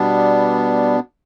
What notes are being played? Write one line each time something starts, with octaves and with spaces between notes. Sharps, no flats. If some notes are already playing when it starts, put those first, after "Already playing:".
Already playing: B2 G3 B3 D4